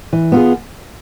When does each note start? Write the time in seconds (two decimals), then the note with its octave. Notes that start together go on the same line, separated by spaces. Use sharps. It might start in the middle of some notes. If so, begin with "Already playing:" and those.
0.13 E3
0.32 B3 F4 G#4